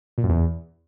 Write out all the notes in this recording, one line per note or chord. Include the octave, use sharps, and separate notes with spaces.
A#2
F#2
E2